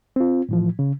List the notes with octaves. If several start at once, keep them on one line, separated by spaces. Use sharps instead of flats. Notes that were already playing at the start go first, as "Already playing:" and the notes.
C4 F4
A2 E3 F3
C#3